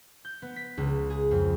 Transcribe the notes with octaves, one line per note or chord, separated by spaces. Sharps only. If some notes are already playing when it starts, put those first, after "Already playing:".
G6
B3
B6
C#2
G#4
F2